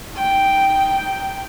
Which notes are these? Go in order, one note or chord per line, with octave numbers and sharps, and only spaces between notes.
D#4 G5